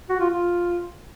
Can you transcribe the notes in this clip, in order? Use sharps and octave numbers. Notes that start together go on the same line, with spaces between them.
F#4
F4
F4